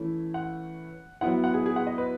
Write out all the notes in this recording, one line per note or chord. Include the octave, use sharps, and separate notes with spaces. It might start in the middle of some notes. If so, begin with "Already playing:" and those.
Already playing: E3 A3 C#4 E4
F#5
F#3 B3 E4 F#5
F#5
G#4
G#4
F#5
D#5
B4